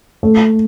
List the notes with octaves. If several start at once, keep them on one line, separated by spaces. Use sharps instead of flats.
A3